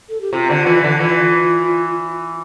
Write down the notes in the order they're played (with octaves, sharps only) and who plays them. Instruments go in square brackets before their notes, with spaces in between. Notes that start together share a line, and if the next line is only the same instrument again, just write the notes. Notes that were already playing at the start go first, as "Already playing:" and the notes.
[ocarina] A4
G4
[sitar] C3 [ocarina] F4
[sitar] D3
E3
D3
[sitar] E3 [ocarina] F4